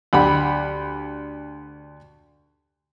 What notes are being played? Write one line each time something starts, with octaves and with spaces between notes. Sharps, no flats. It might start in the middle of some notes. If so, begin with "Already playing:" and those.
D2 G4 B5